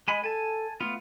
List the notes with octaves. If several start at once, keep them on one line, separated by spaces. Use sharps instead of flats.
G#3 D#5 G#5 B5
A4 G#5 A5
A3 B3 F4 F5